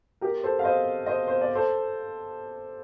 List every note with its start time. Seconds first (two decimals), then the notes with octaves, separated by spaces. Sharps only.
0.21 G4 A#4
0.44 A4 C5
0.59 F5
0.64 C5 D#5
1.06 C5 D#5
1.28 C5
1.41 D5
1.55 A4 C5